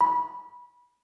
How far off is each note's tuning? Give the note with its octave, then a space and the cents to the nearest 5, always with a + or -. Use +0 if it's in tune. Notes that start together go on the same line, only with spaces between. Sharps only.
B5 -25